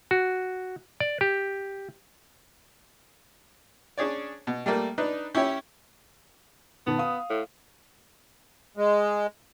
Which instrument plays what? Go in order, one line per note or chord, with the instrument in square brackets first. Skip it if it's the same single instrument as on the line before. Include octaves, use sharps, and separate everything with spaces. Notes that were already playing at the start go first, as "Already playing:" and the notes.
[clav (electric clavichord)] F#4
D5
G4
[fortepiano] C#4 D4 G#4 C#5 D5
B2
G3 A3 A#3
D4 D#4 B4
C#4 E4 G4 C#5
[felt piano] B2 D#3 A5 [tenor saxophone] B3
[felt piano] F5 D#6
[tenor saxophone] A2
[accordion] G#3